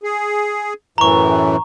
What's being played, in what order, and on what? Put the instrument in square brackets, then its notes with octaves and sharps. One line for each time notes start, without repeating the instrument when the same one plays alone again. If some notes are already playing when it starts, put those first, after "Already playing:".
[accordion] G#4
[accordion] F#2 A2 E3 [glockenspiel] A#5 C#6